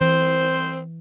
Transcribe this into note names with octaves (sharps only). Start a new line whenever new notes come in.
E3 C4 C5